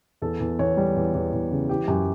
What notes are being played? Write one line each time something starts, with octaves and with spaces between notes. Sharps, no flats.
E2 A4
E2
E2 C#5
G3
E2
E2
E2
C#3
E3 G4
F#2 G4